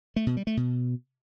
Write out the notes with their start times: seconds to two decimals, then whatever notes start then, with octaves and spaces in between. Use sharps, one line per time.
0.16 A3
0.27 B2
0.37 G3
0.47 A3
0.57 B2